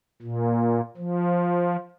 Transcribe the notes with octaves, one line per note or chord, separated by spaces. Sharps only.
A#2
F3